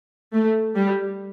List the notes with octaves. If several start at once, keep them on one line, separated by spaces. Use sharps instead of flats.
A3
G3